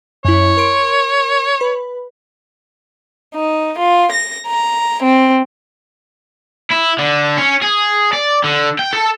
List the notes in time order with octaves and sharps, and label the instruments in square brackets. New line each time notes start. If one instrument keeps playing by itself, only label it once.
[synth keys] F#2 E4 [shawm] C#5
[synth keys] A#4 C6 D7
B4 B5
[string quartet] D#4
F4
A#6
A#5
C4
[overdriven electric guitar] E4
D3
C#4
G#4
D5
D3
G5
A4